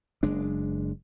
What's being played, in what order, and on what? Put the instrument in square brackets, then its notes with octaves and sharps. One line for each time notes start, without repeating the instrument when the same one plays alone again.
[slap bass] F#1 G#3 D4